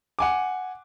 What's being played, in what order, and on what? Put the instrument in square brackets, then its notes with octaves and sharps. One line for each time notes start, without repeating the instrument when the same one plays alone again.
[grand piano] F#5 G#5 D6